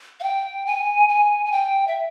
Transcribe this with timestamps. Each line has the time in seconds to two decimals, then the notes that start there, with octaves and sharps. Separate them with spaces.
0.20 F5
0.23 G5
0.67 G#5
1.09 G#5
1.46 G#5
1.52 G5
1.88 E5